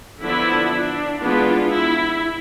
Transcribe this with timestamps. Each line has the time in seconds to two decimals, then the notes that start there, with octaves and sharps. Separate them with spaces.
0.22 D3 F3 B3 D4 E4
0.71 D4
1.19 E3 G#3 B3 D4 F4
1.69 E4